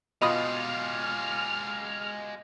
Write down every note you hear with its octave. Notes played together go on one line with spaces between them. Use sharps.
B2 G#3 F4 G4 D#5 B5 D#6 F6